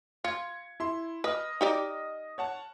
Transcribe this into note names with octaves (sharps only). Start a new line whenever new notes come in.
F4 G#6 C#7
E4 C6
B4 D#5 D#6 F6
D#4 G4 D5
C#5 F#5 A5